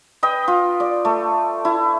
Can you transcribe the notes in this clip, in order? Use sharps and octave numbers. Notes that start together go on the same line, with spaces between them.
B4 D#5 G5
F4
D5
A3
E4